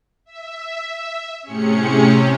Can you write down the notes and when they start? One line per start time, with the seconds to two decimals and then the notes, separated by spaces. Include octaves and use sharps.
0.25 E5
1.43 A2 C3 C#4 G#4 C#7